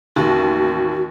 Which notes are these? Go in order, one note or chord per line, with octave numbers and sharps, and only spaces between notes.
A1 D#2 F#4